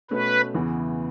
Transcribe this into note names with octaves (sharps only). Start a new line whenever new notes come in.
B2 A3 C#4 B4
E2 C#3 E3 B3